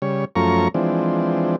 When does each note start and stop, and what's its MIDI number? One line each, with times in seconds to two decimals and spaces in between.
0.02 0.25 49
0.02 0.25 55
0.02 0.25 73
0.36 0.68 42
0.36 0.68 53
0.36 0.68 57
0.36 0.68 61
0.36 0.68 82
0.36 0.68 85
0.74 1.56 52
0.74 1.56 53
0.74 1.56 56
0.74 1.56 60
0.74 1.56 62